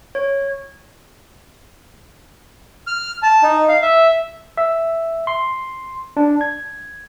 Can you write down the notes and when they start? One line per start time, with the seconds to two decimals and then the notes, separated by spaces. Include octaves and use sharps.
0.15 C#5
2.87 F6
3.23 A5
3.43 D#4
3.69 F5
3.82 E5
4.57 E5
5.27 C6
6.17 D4
6.41 G#6